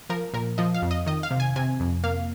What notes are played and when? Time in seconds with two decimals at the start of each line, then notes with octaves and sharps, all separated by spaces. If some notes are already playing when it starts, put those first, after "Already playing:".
0.10 F3 A#4
0.34 A#2 A#4
0.58 F3 D#5
0.74 F5
0.82 F2
0.91 D#5
1.06 D#3 D#5
1.23 F5
1.31 C3
1.40 G#5
1.56 C3 G#5
1.80 F2
2.04 A#3 F5